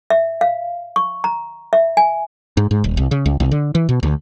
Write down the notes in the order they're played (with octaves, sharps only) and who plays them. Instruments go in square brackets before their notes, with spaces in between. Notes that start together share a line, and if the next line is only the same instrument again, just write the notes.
[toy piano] E5
F5
C#6
A#5
E5
G#5
[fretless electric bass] G#2
G#2
D#1
C2
C#3
C#2
C2
D3
E3
B2
D2